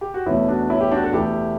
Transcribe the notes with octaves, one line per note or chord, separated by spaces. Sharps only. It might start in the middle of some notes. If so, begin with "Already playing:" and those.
G4
F#4
E2 B2 A3 C#4 E4
D4 F#4
C#4 E4
G4
D4 F#4
A4
E2 B2 A3 E4 G4